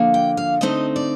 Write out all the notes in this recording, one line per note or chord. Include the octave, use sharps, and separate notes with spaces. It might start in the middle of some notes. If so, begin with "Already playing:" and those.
Already playing: D3 F3 A#3
G5
F5
D3 A3 C4 D#4 D#5
D5